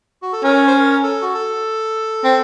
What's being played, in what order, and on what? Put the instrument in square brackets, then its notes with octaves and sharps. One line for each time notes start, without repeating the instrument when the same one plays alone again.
[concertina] F#4
A4
[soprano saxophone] C#4 [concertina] A#4
[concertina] C5
A#4
A4
F#4
A4
[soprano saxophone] C4